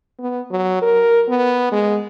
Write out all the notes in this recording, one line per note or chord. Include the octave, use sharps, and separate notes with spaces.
B3
F#3
A#4
B3
G#3